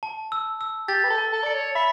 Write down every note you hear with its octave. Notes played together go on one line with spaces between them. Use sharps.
A5
E6
E6
G4 A6
B4
A4
A5
A4
D5 C#7
C#5
E5 B5